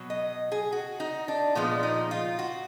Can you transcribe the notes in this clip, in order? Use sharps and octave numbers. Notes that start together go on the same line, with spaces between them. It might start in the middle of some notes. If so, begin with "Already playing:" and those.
Already playing: B2 F#3
D#5
G#4
F#4
D#4
D4
A#2 F3 G#3 B3
D#4
F4
F#4